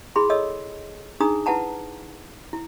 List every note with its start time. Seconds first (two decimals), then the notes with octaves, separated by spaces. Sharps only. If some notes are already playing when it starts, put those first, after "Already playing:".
0.16 E4 G#4 B5 C6
0.30 A4 C#5 D#5 E6
1.20 D4 D#4 G#4 A#5 D#6
1.46 E4 B4 F#5 A5 A#5
2.53 E4